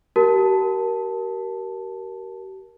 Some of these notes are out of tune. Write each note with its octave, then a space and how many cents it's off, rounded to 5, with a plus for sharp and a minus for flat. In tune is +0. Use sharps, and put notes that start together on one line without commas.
G4 -40 A#4 +5 A5 +0